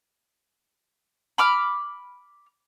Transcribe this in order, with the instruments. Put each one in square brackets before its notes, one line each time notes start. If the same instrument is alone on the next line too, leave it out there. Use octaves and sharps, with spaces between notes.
[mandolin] B5 D6 F6